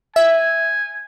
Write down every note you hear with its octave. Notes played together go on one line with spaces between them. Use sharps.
E5 G#5